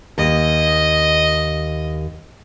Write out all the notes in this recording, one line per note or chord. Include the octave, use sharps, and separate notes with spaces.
D#2 D#5